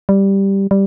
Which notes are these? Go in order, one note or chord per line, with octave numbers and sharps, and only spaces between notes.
G3
G3